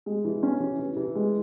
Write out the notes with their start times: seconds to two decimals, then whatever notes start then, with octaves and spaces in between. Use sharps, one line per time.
0.06 G#3
0.25 E3
0.43 C#4
0.60 E3
0.79 E3
0.97 E3
1.15 G#3